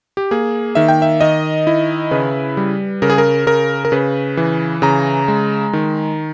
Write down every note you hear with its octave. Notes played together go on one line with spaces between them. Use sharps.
G4
A#3 G#4
D#3 E5
G5
E5
D#3 D#5
E4
C#3 B4
G3
C#3 A#4
G#4
A#4
C#3 A#4
A#4
C#3 B4
E3
C#3 A#5
G#3
D#3